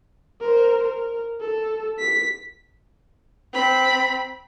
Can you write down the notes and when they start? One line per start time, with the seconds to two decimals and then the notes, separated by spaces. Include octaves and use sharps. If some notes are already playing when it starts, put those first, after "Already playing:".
0.41 A#4 C5
0.83 A#4
1.40 A4
1.99 B6
3.53 C4 B5